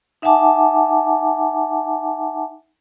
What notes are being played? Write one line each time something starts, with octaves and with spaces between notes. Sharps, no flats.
D#4 E5 F#5 G#5 A5 D6